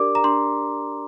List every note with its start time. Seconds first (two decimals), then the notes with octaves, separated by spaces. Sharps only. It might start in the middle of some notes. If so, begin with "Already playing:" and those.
Already playing: D4 G4 A#4 D5 D6
0.15 A#5
0.24 D4 C6